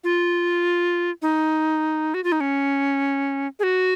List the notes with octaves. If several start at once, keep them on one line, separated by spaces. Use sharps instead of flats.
F4
D#4
F#4
F4
D#4
C#4
G#4
F#4